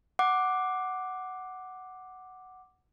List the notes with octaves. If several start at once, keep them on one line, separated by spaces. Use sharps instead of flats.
F#5 D6